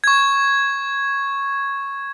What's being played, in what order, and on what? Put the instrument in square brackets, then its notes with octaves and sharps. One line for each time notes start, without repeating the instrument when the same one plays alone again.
[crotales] C#6 G#6